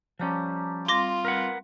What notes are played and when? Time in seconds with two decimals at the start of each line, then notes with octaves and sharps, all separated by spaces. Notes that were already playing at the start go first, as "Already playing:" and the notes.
0.19 F3 G3 C#4 A5 A#5 D6
0.88 G3 C4 F4 C6 D6 A#6
1.25 A#4 B4 F#5